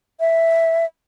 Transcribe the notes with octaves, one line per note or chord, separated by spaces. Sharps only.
E5